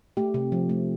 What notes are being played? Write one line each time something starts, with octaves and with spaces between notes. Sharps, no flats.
A3 G4
C3
F3
A3